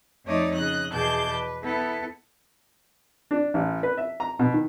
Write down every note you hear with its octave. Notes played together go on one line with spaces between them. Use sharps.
F2 A3 D#4 C#5 D5 D#6
C#3 D#5 F#6
E2 B2 G#4 A5 D6 G6
B4
B3 E4 A4
D4
A1
B4
E5
A#5
B2
D#3